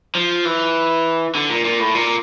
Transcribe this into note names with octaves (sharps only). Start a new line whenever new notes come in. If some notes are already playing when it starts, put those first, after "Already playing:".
F3
E3
D3
A#2
A#2
A2
A#2